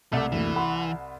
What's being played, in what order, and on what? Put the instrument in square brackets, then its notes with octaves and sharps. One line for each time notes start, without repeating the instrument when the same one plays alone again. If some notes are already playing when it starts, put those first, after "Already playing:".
[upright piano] C2 [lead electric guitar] A3 [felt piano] E5 F#5 D6
[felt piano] F#1 D2 [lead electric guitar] E3
[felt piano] F#5 B5 C6